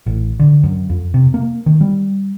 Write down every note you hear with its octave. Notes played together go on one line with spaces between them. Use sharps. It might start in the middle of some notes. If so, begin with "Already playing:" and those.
A1
D3
F#2
F2
C3
A#3
D#3
G3